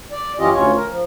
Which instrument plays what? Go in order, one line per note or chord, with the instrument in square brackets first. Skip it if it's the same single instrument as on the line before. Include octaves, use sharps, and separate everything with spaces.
[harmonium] D5
F#2 E3 C#4 F4 G4 D#5
D2 C#4 F4 C#5
A#4
F3